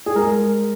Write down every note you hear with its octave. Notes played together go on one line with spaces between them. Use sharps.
G#4
G#3 A#4